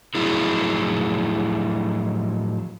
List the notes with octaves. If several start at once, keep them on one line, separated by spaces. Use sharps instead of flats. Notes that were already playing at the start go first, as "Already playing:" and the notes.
A2 F3 F#3 D#4 E4 G#4